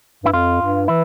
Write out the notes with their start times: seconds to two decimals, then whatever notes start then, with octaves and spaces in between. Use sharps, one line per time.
0.24 G2 E4
0.33 F2 F4
0.61 G2
0.88 E3 E4